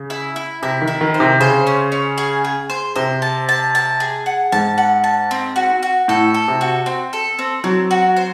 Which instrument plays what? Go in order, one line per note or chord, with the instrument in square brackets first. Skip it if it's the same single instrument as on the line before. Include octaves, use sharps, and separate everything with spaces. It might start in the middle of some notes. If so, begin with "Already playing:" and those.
Already playing: [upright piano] C#3
[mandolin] E4
E4
[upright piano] C3 [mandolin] E4
[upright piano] D#3
[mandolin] E4
[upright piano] D#3
[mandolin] C5
[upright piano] C3
[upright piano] C#3 [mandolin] C5
[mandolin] C#4
C#4
G#4
G#4
C5
[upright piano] C3 [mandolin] C5
[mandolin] A5
A5
A5
G#4
F#5
[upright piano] G#2 [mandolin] A5
[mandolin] F#5
A5
C4
F#4
F#4
[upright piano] A2 [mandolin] A4
[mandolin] A4
[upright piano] C3
[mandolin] F#4
C4
A4
C4
[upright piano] F#3 [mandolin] C4
[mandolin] F#4
C5